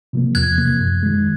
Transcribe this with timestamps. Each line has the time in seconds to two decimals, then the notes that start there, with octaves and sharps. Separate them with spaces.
0.13 C3 F3 A#3
0.35 E2 F#6 G#6
0.58 C3 F3 A#3
0.80 F#2
1.03 D#3 G#3